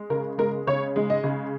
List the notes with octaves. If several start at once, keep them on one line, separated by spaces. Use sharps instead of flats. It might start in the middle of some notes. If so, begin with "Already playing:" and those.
Already playing: G#3
C#3 A#4
G#3 A#4
C#3 C#5
G#3
D#5
C#3